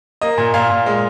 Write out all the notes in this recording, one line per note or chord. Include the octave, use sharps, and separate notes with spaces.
A#3 D#5
A#2
A#2 F5
A#2
G#3